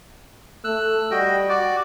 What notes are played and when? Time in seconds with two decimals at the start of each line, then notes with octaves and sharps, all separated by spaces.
0.64 A3 E6 F#6
1.11 G3 F#4 D#5 G5
1.49 F#4 D5